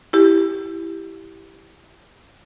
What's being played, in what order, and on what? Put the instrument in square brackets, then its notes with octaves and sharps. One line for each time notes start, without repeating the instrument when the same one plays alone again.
[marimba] E4 G4